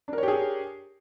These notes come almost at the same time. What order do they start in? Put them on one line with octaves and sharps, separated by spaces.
D4 A#4 C#5 G4 G#4